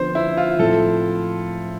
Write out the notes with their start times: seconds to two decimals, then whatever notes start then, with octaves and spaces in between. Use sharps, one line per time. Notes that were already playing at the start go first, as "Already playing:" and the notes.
Already playing: D3 F3 B3 C5
0.15 E4
0.37 F4
0.59 A2 F3 C4 A4